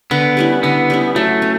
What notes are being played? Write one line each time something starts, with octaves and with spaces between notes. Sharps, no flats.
D3 B3
G3 C#4 E4
D3 B3
G3 C#4 E4
F#3 A3
C#4